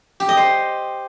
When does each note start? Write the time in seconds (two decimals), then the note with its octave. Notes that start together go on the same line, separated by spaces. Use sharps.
0.20 G4
0.29 D#5
0.37 C5